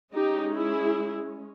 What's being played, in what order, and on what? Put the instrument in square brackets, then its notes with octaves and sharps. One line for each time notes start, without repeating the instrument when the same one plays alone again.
[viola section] G#3 C#4 D#4 G4
E4 G#4